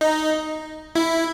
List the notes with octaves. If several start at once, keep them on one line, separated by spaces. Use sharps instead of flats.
D#4
E4